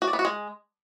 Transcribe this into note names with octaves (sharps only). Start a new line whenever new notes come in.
F#4
D5
B3
F#4
G#3